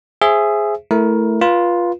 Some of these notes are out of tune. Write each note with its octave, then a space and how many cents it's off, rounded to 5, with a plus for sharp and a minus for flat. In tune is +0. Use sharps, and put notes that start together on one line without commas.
G#4 +0 C5 +0 E5 +20
A3 +0 E4 +0 A#4 +15
F4 +0 B4 -30